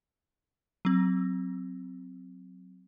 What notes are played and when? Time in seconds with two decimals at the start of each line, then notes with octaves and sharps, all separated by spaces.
0.85 F#3 C4